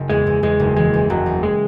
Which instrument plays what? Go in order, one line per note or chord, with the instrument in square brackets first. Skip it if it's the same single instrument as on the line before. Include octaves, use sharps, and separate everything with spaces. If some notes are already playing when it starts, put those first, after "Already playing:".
Already playing: [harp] F#1 C#3
[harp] E2 [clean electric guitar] G#3
[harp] E2
[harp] E2 [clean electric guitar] G#3
[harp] F#1
[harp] E3 [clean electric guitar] G#3
[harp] E2
[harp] F#1 [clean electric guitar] F#3
[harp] E2
[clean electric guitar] G#3